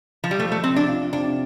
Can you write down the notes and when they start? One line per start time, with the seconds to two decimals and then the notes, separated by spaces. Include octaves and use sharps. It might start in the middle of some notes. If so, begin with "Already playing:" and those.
0.24 F3
0.31 G3
0.39 F3 A3
0.52 A3
0.64 C3 C4
0.76 D4
0.88 F4
1.13 C3 D4